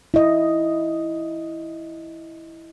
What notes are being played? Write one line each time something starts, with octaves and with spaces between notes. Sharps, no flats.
E4 D#5